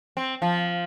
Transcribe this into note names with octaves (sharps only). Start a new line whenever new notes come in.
C4
F3